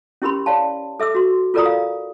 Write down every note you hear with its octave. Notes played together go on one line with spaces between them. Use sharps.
C#4 E4 G4 A#4 B5 C6
C#5 D5 F5 A5
A4 E5 D6 E6
F#4 C6
F4 A4 A#4 D5 A#5 D#6
F5